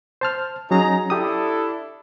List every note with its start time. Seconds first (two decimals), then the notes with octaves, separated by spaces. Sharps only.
0.21 C5 A5 F6
0.71 F#3 C#4 D#4 G#4 A#5
1.10 D4 E4 G4 A4 D#6